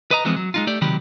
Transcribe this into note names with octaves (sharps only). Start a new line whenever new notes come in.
B4 D#5 A#5
E3 F3 G#3 B3 C4
F#3
G#3 D#4 F4
A3 G4 D5
C#2 C3 D#3 F#3 G4 B5